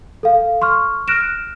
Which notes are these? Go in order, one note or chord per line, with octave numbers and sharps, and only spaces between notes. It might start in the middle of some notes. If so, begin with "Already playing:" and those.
A4 F5
C6 C#6 F6
F6 F#6 A#6 D7 E7